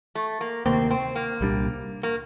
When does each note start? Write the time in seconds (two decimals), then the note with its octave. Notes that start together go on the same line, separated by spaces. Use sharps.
0.15 A3
0.41 A#3
0.66 D2 C3 D#3 A#3 C4
0.90 C4
1.15 A#3
1.41 C2 A#2 G3 D4
2.03 A#3